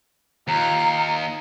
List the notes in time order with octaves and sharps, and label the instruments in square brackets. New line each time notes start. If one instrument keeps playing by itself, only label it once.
[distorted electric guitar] D#2 [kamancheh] F4 A#5